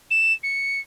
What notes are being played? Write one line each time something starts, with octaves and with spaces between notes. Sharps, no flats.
E7
C#7